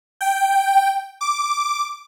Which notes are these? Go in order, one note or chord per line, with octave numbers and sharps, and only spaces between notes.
G5
D6